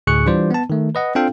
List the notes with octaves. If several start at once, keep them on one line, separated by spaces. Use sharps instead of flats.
D2 A2 G#4 C#6 F#6 C#7
E3 G3 D4 F4 C5 D5
B3 A5
D#3 A3
B4 D#5 F#5
C4 D4 F4 A4 F5 G5